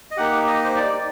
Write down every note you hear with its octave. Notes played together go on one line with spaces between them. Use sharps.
D#5
A#3 D#4 G4 F#5
D#5
C5
D5